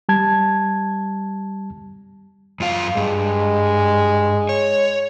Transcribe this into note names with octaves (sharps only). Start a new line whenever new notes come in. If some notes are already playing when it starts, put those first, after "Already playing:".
G3 A5 G#6
F#2 F4 F5
G2 G#3
C#5